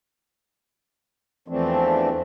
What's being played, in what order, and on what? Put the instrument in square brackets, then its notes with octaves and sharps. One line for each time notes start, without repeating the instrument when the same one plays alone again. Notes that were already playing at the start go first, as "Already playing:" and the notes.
[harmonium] E2 E3 F3 A3 C4 D4